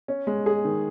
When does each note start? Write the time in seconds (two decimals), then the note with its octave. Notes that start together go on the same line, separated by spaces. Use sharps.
0.08 C#4
0.27 G#3
0.46 G#4
0.65 D#3